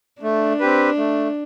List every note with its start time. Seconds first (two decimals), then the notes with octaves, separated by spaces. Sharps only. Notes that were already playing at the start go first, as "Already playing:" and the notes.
0.22 A3 D4
0.60 C4 G4 B4
0.98 A3